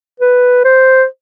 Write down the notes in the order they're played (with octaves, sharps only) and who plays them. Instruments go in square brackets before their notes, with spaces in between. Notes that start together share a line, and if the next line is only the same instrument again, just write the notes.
[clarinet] B4
C5